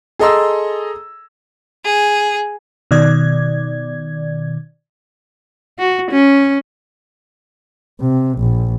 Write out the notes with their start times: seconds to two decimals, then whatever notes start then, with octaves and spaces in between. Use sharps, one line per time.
0.19 G#4 A4 D#5 A#5 C6 E6
1.85 G#4
2.91 B2 D#3 D5 G#6
5.79 F#4
6.11 C#4
8.01 C3
8.39 A#1